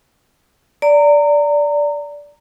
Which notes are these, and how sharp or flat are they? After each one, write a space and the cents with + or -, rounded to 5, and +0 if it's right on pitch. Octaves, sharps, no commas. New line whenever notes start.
D5 -10 A#5 -25